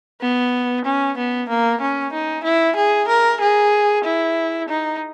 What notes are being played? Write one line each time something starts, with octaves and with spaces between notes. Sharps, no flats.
B3
C#4
B3
A#3
C#4
D#4
E4
G#4
A#4
G#4
E4
D#4